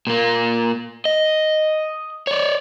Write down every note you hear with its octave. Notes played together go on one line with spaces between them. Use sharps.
A#2 A#3
D#5
C#5 D5